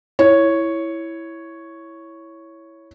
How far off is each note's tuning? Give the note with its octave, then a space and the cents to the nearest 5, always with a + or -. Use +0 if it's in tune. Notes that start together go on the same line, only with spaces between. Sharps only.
E4 +0 C#5 +0